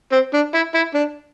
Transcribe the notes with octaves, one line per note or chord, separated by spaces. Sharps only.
C4
D4
E4
E4
D4